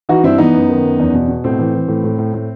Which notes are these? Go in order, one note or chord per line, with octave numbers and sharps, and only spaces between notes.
E3 D#4 F#4
G2 C4 E4
E3 B3 D#4
F#2
D#3
F#2
E2
B2
B2
A2 C4
E3
E3
A2
A2
A2
A2